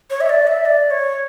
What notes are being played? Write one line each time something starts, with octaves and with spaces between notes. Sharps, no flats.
C#5
E5
D5
E5
D5
C#5